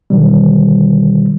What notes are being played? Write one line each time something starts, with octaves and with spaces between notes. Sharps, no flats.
B2 D3 D#3 F#3 G3